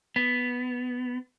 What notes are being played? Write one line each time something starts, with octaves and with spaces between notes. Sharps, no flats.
B3